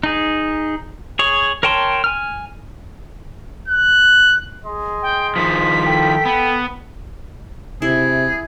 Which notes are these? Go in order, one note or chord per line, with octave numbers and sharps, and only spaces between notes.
D#4 G#4
G#4 C#5
A#4 C#5 G5 A5 C6
G#5 F6
F#6
G#4 D#5 C6
G5
D#3 F3 B6
A4 G5
B3
C3 E4 G#4